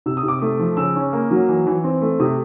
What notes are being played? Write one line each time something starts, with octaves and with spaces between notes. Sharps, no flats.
C3 E6
D#6
C3
D6
A3 D#6
F3
C#3 E6
C#4
A#3
F#3
E3
E3
C4
A3
C3 D#6